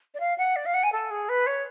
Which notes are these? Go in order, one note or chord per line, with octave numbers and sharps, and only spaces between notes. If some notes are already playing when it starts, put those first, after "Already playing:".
D5
F5
F#5
D5
F5
F#5
G#5
A4
G#4
B4
C#5